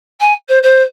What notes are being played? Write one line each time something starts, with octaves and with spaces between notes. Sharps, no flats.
G#5
C5
C5